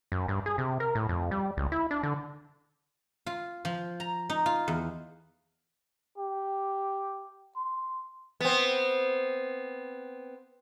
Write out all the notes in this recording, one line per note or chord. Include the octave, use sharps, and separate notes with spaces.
F#2
G2
G#4
C3
A#4
A2
F2
G3
C#2
E4
D4
D3
F4
F3
A#5
D#4
F4
E2
G4
C6
B3 C4